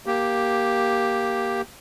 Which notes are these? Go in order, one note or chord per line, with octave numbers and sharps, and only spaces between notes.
A#3 G4